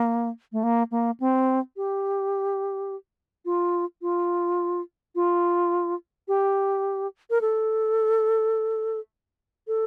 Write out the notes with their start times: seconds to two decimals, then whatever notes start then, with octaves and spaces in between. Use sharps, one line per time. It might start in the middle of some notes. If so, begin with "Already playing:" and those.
Already playing: A#3
0.52 A3
0.63 A#3
0.91 A#3
1.20 C4
1.77 G4
3.45 F4
4.02 F4
5.15 F4
6.28 G4
7.30 A#4
7.41 A4
9.67 A4